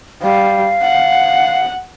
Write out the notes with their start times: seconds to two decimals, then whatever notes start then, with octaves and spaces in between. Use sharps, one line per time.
0.22 G3 F5
0.82 F#5